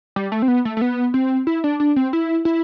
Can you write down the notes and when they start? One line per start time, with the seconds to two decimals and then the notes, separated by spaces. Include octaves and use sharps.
0.16 G3
0.32 A3
0.42 C4
0.48 B3
0.65 A3
0.77 A3
0.81 B3
1.14 C4
1.47 E4
1.64 D4
1.80 D4
1.96 C4
2.13 E4
2.45 E4